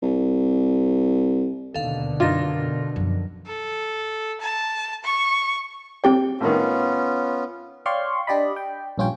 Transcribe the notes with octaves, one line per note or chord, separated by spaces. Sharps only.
C2
D#2 B2 D3 D#3 D#4 A4 F5
F#2 D4 D#4 F4 A#6
F#2 F3
A4
A5
C#6
C4 G4 C#5 G5
A2 D#3 B3 C#4 F4
C#5 D5 F5 G5 C6 C#6
D4 G4 D5 D#5 B5
G5
A#1 G2 C#4 F4 C#5 G5